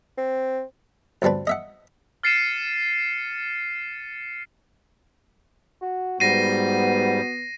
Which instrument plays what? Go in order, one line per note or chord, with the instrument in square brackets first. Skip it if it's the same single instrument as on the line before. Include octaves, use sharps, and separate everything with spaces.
[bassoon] C4
[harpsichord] D2 G2 C4 D4 B4
D#5 E5 F#5
[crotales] F6 A6 C7 C#7 D#7 E7
[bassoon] F#4
[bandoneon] G#2 G3 [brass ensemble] B3 [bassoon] F#4 [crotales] A#6 C7 D#7